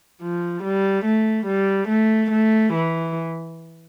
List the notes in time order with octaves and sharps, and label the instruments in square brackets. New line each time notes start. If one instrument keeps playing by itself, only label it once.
[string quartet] F3
G3
A3
G3
A3
A3
E3